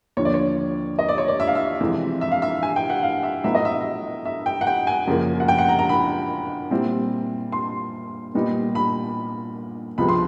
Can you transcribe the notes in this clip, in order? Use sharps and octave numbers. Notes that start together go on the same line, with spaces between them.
D#2 D3 F3 C#5
D5
C#5
D#5
D5
C#5
D5
E5
F5
E5
F2 C3 E3 G#3
E5
F5
E5
G#5
G5
F#5
F5
E5
A2 F#3 B3 D#4 E5
D#5
E5
E5
G5
F#5
G5
G#5
F#2 C#3 F3 A#3
F#5
G5
F#5
A#5
A#5
B5
A#2 G3 C4 E4
C6
A#2 G3 B3 D#4
B5
C#2 C3 F3 G#3 B3 B5
C6